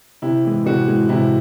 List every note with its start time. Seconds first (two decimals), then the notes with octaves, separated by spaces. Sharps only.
0.22 C3 E4
0.45 E3 G#3
0.66 C3 F#4
0.88 E3 G#3
1.09 C3 E4